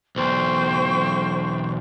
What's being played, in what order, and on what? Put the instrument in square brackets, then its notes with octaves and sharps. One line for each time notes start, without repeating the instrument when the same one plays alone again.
[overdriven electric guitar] B1 E2 [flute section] C5 G5 C#6